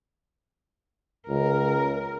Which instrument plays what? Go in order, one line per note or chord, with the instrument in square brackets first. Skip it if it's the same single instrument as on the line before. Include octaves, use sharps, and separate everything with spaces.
[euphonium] C#2 [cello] A#4